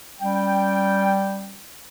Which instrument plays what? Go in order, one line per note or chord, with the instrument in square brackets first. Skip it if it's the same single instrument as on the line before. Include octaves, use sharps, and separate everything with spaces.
[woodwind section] G3 C#4 G5